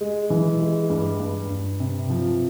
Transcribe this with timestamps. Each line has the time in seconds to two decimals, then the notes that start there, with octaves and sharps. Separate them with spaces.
0.01 G#3
0.30 E3
0.60 G#3
0.90 G2
1.20 G2
1.50 G2
1.80 C3
2.10 F3